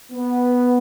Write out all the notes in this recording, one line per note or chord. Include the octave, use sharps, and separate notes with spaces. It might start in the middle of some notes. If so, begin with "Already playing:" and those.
B3